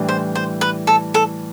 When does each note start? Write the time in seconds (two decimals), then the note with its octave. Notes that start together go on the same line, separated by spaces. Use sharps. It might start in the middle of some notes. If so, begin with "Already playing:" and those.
Already playing: A2 E3 G3 D4
0.08 C5
0.35 C5
0.61 B4
0.87 A4
1.14 A4